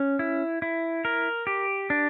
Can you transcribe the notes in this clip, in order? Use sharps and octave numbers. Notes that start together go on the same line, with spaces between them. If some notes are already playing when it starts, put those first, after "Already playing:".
Already playing: C#4
E4
E4
A#4
G4
D4